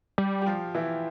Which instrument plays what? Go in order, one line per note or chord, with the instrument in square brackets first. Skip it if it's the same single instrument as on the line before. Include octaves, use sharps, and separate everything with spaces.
[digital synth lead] G3
[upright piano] G4
F3 F4
E3 E4